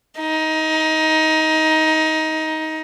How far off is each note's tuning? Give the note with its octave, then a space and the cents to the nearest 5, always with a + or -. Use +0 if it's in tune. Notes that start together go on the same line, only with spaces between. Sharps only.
D#4 +20